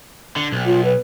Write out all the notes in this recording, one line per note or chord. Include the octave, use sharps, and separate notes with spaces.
D3
B1
F4
B4